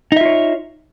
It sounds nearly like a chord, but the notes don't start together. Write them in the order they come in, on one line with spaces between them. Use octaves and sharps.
D#4 E5 F4 C#5